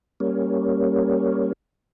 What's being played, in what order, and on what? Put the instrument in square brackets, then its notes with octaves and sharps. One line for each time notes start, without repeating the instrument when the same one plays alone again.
[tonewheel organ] G3 A#3 C#4